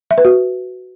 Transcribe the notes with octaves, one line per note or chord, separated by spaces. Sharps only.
E5
B4
F#4